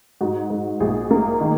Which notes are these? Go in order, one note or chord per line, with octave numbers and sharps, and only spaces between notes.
G#2 F#4
G#2
A#1 G#4
A#3
D#3